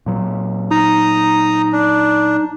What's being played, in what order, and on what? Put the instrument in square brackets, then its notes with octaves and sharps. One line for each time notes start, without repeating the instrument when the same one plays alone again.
[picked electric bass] A#2 F#3
[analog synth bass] D#4 [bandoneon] A#5 D#6
[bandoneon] D4